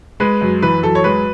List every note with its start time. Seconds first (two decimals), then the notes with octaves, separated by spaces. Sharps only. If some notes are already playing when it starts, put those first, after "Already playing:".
0.20 G#3 B4
0.41 F#2
0.62 E3 B4
0.83 F#2 A4
0.95 C#5
1.04 G#3 B4